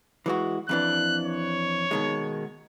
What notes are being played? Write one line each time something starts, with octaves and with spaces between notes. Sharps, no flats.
E3 G#3 F#4
F2 E3 D4 F#6
C#5
B2 D#3 G#3